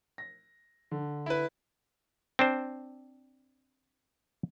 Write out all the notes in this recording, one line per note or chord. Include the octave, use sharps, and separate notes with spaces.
A#6
D3
E4 B4
C4 D4 C5